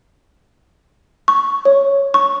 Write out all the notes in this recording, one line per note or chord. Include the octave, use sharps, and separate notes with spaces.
C#6
C#5
C#6